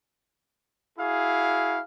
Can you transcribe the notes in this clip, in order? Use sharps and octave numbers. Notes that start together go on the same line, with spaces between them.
E4 F#4 G#4 F5